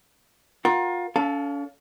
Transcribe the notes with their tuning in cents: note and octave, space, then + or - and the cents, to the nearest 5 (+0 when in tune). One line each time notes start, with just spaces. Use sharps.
F4 +30 A#4 +25 F#5 +30
C#4 +40 A4 +0 F5 +0